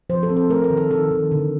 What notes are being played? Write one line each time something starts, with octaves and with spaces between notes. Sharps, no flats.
F3 C5
A4
C4
A4
A3 A#4
A#4
D#3
A4
D#3 A4
D#3
D3